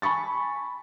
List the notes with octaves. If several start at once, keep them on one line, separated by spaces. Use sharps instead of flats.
G#5 A5 B5 C#6 A6